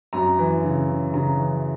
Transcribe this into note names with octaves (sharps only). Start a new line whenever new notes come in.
F#2 A#5
E3
C#3
C#3
C#3 A#5
E3